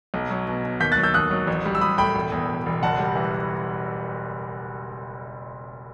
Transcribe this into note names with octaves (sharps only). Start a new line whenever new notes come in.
B1
F#3
B2
B2
D#2 G6 B6
F#6 A6
F#3
E6 G6
D#2 D#6 F#6
F#3
A1
G3
E6
G3 B5 D#6
A2 G5 B5
E1
E2
E1
E1
F#1 F#5 A5
G3
E3